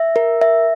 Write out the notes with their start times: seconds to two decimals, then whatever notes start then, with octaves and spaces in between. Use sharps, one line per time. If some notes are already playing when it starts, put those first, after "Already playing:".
Already playing: E5
0.16 A#4
0.41 E5